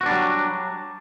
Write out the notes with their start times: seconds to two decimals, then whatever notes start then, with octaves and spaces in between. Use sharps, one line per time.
0.01 F#4
0.03 C4
0.06 D4
0.08 G3
0.11 F#3